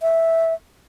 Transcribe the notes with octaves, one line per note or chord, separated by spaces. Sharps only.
E5